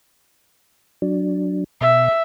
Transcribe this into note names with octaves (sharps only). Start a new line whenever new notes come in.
F#3 D4
B2 E5